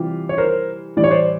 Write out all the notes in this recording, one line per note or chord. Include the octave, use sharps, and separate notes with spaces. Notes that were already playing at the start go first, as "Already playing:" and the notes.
Already playing: C3 E3 G3 F4 G4
C#5
A#4 C5
A2 E3 G3 D5
C#5
C5 D5